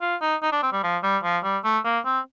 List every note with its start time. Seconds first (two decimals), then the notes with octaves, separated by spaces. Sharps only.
0.01 F4
0.21 D#4
0.42 D#4
0.52 D4
0.63 C4
0.72 G3
0.83 F3
1.03 G3
1.23 F3
1.44 G3
1.64 A3
1.85 A#3
2.05 C4